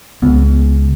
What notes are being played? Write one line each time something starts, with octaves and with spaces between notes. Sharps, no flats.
C#2 B3